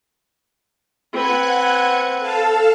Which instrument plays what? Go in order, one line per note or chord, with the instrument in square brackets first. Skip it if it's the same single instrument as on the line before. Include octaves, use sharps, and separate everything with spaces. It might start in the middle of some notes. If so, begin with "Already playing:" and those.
[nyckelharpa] C4 B4 [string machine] F#5 F#6 G#6
[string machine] A4 F5 A5